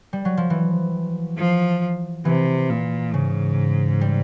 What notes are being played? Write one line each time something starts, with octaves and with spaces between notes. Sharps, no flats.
G3
F#3
F3
E3
F3
C3 E3
A#2
G#2 C#3
G3